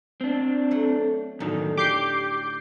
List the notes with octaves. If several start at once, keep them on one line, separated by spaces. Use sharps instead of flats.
C4 D4
F#3 A3 F#5
F#2 A2 D3 D#3 F3 D#4
G4 D6 G6 C7